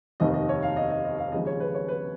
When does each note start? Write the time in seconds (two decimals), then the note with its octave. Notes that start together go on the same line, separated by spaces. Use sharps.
0.20 F1 D#2 D#3 D#5
0.34 D#5
0.49 C#5
0.62 F5
0.76 D#5
0.91 D#5
1.05 D#5
1.18 F5
1.32 D#2 C#3 F3 G#3 D#5
1.47 C#5
1.60 B4
1.75 C#5
1.88 B4